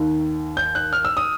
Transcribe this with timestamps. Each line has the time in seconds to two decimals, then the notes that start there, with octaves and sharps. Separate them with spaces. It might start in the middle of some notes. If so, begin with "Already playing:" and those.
Already playing: D#2 D#3
0.57 G6
0.75 F#6
0.93 F6
1.05 E6
1.17 D#6